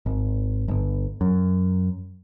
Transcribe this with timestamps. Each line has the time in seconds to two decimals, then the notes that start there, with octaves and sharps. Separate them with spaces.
0.06 G#1
0.68 G1
1.21 F#2